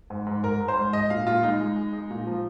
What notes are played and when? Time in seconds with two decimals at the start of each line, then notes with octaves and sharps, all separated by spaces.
0.10 G#2
0.27 G#2
0.43 G#2 A#4
0.60 G#2
0.68 C5
0.76 G#2
0.93 G#3 D#5
1.10 A#2 F5
1.27 A#2 F4
1.43 G#3 D#4
1.61 G#3
1.76 G#3
1.93 G#3
2.11 A#2
2.27 F3